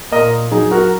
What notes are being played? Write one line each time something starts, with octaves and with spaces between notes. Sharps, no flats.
A#2 A#4 D#5
F#3 D#4 G#4
F#4 A#4